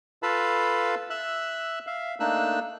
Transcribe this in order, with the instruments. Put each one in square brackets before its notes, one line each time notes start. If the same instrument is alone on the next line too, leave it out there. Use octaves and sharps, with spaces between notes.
[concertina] F4 A4 B4 F5 A5 B5
E5 E6 F#6
E5 F5
A3 A#3 D4 D#4 E6 F#6